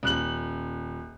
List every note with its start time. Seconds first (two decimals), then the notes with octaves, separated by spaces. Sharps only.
0.03 D#1 F#6 F#7